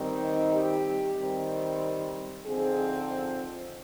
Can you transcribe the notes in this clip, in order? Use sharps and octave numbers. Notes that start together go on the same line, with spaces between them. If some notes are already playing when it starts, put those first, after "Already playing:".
Already playing: D#3 G3 C4 D#4
G4
D#3 G3 C4
D3 F3 C4 D#4 G#4